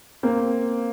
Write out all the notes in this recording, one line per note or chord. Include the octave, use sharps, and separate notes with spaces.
A#3 C4